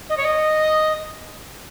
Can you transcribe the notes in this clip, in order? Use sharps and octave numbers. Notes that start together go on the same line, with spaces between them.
D#5
C#5
D#5